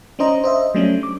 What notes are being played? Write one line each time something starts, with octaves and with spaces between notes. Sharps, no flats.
C#4 D4 C5 D#5 A#5
C5 D#5 E5
F#3 G3 A3 C#4 D4
D6